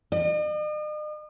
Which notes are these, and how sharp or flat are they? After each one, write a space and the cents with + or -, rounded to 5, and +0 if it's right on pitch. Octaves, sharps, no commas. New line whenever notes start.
D#5 -45